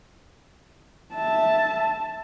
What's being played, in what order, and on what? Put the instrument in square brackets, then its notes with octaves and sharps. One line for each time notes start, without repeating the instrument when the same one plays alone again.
[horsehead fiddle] E5 A5